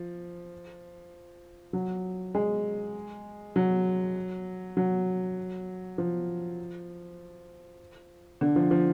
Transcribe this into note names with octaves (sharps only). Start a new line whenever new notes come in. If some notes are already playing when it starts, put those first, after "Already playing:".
Already playing: F3
F#3
G#3
F#3
F#3
F3
D3
F3
F3